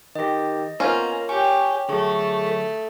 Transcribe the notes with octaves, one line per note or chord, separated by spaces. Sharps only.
D#3 G4 D#5 A#6
A#3 B3 C#4 F4 C5 G#5 A#5
G4 C#5 G#5 C#6
D3 F#3 A3 G#4 C#6
A4